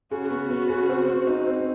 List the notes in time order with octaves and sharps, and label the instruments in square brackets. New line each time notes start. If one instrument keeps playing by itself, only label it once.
[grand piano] C#3 [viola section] F#4
[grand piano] B3
B3
C#3
C4
C4
D#4
C4